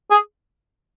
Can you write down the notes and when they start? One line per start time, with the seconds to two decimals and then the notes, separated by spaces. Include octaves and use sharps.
0.11 G#4